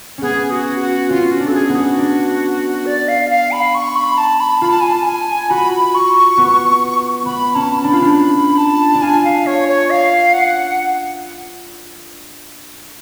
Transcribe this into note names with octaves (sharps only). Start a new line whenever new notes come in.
B3 C#4 G#4
F#4
F#4
C#4 F4
F#4
D4
A4
G#4
B3
F#4
D4
D5
F5
F5
B5
C#6
B5
A5
B5
F4 B5
A5
G#5
A5
G#5
F#4 B5
C#6
B3
B3 B5
C#4 A5
D4 B5
F4
D4
B5
A5
D4
F4 G#5
F5
C#5
C#5
F5
F#5